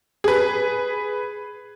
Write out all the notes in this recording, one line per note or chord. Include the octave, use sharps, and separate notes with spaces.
G#4 B4